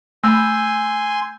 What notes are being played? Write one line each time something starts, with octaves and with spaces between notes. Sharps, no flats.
A3 G#5 B5 C6 E6 G6